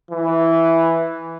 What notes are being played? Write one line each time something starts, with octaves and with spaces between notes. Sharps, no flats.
E3